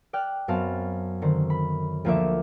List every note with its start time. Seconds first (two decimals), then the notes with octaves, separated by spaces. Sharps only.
0.13 D5 G5 F6 F#6
0.48 F#2 B3 C4 F5 A5 F6
1.22 D3 D#3 C5
1.50 B5
2.05 D2 F3 A#3 D4 E5 D6